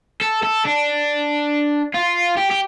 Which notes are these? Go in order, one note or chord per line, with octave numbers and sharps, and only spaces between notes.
A4
A4
D4
F4
G4
G4